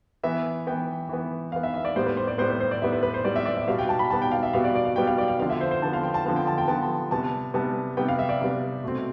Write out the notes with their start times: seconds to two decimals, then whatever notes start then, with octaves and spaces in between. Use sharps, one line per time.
0.24 E3 B3 E5
0.67 E3 B3 G5
1.09 E3 B3
1.52 E3 B3 F5
1.63 E5
1.74 E5
1.85 D5
1.96 A2 G3 B3 C5
2.06 B4
2.17 C5
2.27 D5
2.38 A2 G3 B3 C5
2.49 B4
2.60 C5
2.71 D5
2.82 A2 G3 B3 E5
2.92 B4
3.03 B4
3.14 C5
3.24 A2 G3 B3 D5
3.36 E5
3.45 D5
3.57 E5
3.67 B2 G3 B3 F5
3.78 G5
3.89 A5
3.99 B5
4.10 B2 G3 B3 A5
4.22 G5
4.31 F5
4.43 E5
4.53 B2 G3 B3 F5
4.64 D5
4.75 D5
4.85 F5
4.96 B2 G3 B3 G5
5.07 F5
5.18 D5
5.28 F5
5.40 D3 F3 B3 F5
5.50 E5
5.61 C5
5.71 C5
5.82 D3 F3 B3 A5
5.93 F5
6.03 G5
6.14 A5
6.25 D3 F3 B3 F5
6.36 G5
6.47 A5
6.58 G5
6.68 D3 F3 B3 A5
7.11 C3 G3 B3 A5
7.54 C3 G3 B3 A5
7.97 C3 G3 B3 G5
8.08 F5
8.19 E5
8.29 D5
8.41 C3 G3 B3
8.84 B2 A3 C4